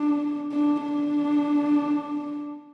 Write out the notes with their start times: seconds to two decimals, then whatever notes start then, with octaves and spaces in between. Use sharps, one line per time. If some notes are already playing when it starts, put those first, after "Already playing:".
Already playing: D4
0.52 D4
0.85 D4